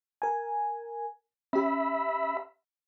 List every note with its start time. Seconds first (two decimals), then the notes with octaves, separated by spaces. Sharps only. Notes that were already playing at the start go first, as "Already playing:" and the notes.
0.22 A#4 G#5
1.53 C#4 G4 E5 B5